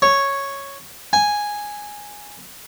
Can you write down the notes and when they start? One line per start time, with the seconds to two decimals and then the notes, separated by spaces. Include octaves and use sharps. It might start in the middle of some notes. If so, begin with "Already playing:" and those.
0.02 C#5
1.13 G#5